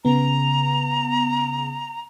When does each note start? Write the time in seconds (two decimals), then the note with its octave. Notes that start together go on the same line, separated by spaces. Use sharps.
0.05 C#3 B3 A#5